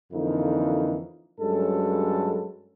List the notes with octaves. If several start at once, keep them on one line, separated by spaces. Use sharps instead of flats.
F2 D3 E3 A#3 D#4 F4
G2 F#3 G#3 C#4 A4